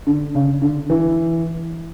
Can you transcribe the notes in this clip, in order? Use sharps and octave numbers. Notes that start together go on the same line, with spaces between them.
D3
C#3
D3
E3